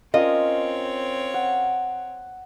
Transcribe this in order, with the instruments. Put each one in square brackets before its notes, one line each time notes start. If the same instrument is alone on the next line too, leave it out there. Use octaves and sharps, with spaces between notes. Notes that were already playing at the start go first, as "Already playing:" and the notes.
[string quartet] C4 C#5 [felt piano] C#4 F4 A#4 [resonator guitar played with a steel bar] D#5
[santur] F#5